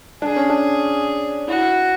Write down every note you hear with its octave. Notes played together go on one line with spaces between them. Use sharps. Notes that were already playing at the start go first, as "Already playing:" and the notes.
D4 G#4
C#4
D4
E4 F#4